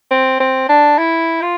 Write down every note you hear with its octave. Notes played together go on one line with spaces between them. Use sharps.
C4
C4
D4
E4
F4